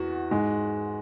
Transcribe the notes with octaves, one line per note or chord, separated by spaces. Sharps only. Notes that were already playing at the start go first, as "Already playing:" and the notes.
Already playing: E2 F#4
G#2 G#3